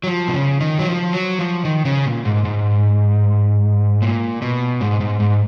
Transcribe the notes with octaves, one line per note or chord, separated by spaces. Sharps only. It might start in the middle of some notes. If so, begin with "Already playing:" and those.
F#3
F3
B2
C#3
D#3
F#3
F3
F#3
F3
D#3
C#3
A#2
G#2
G#2
A#2
B2
G#2
G#2
G#2